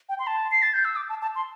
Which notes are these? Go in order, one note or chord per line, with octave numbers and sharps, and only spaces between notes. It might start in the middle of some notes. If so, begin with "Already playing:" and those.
G5
C6
A5
C7
A6
G6
E6
D6
A5
A5
C6